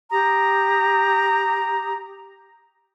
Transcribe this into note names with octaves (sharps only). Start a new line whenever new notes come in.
G4 A#5 D#6